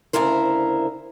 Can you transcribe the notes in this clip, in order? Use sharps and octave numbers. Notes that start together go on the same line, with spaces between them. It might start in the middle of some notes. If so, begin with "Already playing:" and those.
D2 C#3 E4 A#4 C5